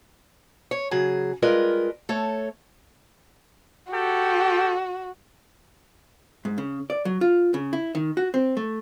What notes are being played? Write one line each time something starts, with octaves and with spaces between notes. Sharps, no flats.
C#5
C#3 F#3 G#4
G3 G#3 F4 A#4 B4 D#5
A3 A4 C#5
F#4 G4 A4 G5
G#2
C#3
D5
F#3
F4
C#3
E4
D#3
F#4
C4
A3